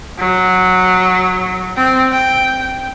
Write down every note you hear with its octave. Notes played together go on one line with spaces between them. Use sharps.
F#3
C4
G5